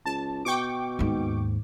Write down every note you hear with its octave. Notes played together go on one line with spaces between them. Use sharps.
C#2 A5
B2 G5 C#6 D6
D#2 G#2